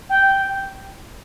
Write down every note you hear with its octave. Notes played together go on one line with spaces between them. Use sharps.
G5